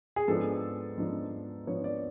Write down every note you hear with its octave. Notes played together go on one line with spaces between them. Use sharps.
G#4
G#2 F3 B3 D4 A4
G#2 F3 B3 D4
G#2 F3 B3 D4 C#5
D5